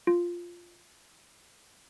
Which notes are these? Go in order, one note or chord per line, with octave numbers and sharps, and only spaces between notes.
F4